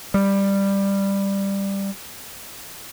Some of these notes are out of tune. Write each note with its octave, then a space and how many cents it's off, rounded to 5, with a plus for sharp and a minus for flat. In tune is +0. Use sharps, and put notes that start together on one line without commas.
G3 +10